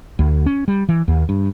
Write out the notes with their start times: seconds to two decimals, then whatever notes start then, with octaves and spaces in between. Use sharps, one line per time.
0.19 D2
0.46 C#4
0.68 G3
0.89 E3
1.08 D#2
1.29 G2